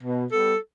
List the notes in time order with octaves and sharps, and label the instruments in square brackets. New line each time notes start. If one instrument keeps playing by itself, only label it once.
[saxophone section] B2
G3 B3 A4